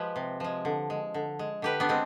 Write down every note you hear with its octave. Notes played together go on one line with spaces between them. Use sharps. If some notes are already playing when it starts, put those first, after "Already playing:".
Already playing: F3 G#3 G4 B4
C3
F3 G#3
D3
G#3
D3
G#3
D3 G4 B4
B3 D4
G#3 C4